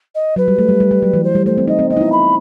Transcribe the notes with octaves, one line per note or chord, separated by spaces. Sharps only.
D#5
F#3 B4
G3
A3
G3
G3
G3
F#3
E3
C5
G3
A3 C5
C4
D#4 D#5
C4
B3 D#5
D#4
E4
B5